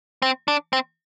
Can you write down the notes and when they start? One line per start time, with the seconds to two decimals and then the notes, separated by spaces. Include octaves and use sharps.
0.22 C4
0.48 D4
0.73 C4